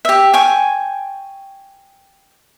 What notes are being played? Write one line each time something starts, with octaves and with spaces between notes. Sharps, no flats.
G4 E5
G5 G#5 C#6